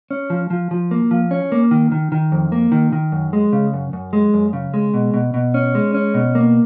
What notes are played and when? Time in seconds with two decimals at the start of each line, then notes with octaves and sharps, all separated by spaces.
0.11 C#4
0.30 F3
0.50 F3
0.71 F3
0.91 A#3
1.11 F3
1.31 C#4
1.52 A#3
1.71 D#3
1.92 D#3
2.12 D#3
2.32 F2
2.52 A#3
2.72 D#3
2.93 D#3
3.12 F#2
3.33 G#3
3.53 C#3
3.73 F#2
3.93 F#2
4.13 G#3
4.34 F#2
4.53 C#3
4.74 G#3
4.94 B2
5.14 B2
5.34 B2
5.54 C#4
5.75 G#3
5.94 C#4
6.14 B2
6.35 A#3